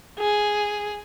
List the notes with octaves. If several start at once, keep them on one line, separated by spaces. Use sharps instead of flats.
G#4